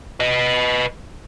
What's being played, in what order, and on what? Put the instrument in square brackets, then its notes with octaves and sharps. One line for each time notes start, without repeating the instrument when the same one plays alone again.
[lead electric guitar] B4 D#5